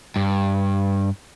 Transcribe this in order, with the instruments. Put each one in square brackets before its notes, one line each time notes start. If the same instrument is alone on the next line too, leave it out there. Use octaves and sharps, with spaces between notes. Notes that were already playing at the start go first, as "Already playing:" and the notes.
[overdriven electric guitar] G2